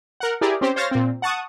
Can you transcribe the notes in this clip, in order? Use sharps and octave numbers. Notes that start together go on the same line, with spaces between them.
A#4 F#5
E4 G4 G#4 A#4 D5
C4 C#4 G4 C5
C5 C#5 F5 F6 A6 A#6
A#2 C4
F#5 A5 C#6 D#6